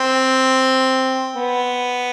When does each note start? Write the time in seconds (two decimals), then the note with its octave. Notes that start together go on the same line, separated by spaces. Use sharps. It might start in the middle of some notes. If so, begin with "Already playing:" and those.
Already playing: C4
1.36 B3